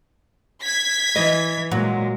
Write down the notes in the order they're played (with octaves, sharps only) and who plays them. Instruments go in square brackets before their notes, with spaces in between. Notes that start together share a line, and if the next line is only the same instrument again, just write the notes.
[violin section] G#6 B6
[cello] E3 [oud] D#5
[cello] A#2 G#3 [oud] F#3